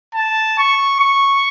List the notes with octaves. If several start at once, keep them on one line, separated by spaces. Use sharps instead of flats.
A5
C#6
C#6